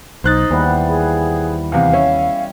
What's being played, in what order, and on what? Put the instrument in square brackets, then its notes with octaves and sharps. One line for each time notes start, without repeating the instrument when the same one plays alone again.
[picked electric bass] B1 [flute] D#4 [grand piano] C5 F#6 A6
[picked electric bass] D#2 [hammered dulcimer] E3 G3 B3
[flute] G#4
[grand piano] E2 C3 [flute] F5
[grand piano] C#4 E5